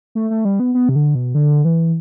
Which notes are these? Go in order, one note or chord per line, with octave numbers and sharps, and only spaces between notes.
A3
A3
G3
B3
B3
C3
D3
B2
D3
E3